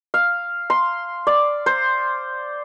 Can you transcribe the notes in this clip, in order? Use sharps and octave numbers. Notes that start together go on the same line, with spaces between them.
F5
C6
D5
C5